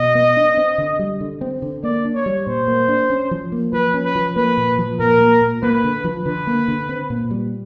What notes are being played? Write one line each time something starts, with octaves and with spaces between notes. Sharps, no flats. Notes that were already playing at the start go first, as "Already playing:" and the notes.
Already playing: B2 D#5
B3
D4
C4
D3
G3
D3
C4
D3
A#3 D5
D4
C#5
G3
A#2 C5
A#3
D4
C#4
F3
A#3
F3 B4
C#4
B4
F3
A#3 B4
A#2
F3
A#2 A#4
A#3
A#2
A#3 B4
D3
F3
D3 B4
A#3
D3
C4
A#2
G3